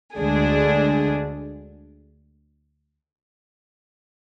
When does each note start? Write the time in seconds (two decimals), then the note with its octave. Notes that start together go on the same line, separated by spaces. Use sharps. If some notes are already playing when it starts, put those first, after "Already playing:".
0.17 D2 D3 G#3 D4 G#4